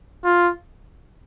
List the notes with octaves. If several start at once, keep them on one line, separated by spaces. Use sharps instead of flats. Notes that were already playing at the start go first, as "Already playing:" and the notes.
F4